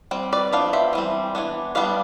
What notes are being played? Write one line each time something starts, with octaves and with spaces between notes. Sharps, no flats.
G3 C4
B4 D5
F3 B3 D4 F5
C5 E5
E3 G3 C4
E3 B3 D4
G3 B3 D4 D5 F5